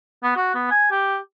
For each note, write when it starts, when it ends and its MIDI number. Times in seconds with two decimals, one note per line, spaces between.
0.24 0.32 59
0.36 0.50 66
0.55 0.71 59
0.71 0.88 80
0.91 1.16 67